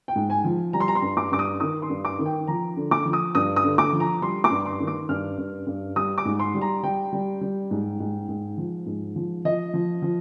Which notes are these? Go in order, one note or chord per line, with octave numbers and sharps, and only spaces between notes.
G5
G#2
G#5
F3
G3 A#5
C6
A#5
C6
G2
D6
G2 D6
D#6
D#3 D#6
C6
G2
D6
D#3
G5
F3 A#5
D3
D6
F3
D#6
G2 D#6
D#6
D3
D6
F3
A#5
G3 C6
D6
G2
C6
D#3
D6
G2 F6
G2
G2
G3 D#6
D6
G#2
C6
G3
A#5
G3 G5
G3
G3
G#2
G#2
G#2
F3
G#2
F3
F3 D#5
F3
F3